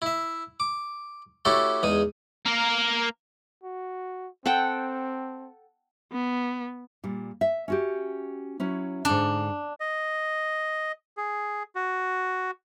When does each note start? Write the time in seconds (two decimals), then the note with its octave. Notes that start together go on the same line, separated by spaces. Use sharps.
0.02 E4 E5
0.60 D6
1.45 A3 C#4 E4 F#4 G4 A4
1.83 E2 G#3 D#4 D#6
2.46 A#3 A#4
3.64 F#4
4.46 C4 A4 F#5 G5
6.12 B3
7.04 A#2 G3
7.41 E5
7.68 C#4 F#4 G4
8.60 F#3 C#4 E4
9.05 G#2 D3 D4 D#4
9.80 D#5
11.17 G#4
11.75 F#4